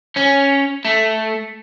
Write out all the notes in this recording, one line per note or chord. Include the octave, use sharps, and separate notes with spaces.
C#4
A3